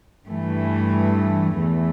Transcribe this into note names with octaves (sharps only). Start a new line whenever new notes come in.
G2 E3 A3
E2 E3 A3